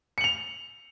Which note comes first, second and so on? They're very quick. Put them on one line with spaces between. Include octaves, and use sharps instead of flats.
C#7 F#7 F7